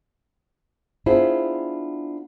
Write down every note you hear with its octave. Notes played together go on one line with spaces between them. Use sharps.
B3 D4 E4 F4 G#4 C5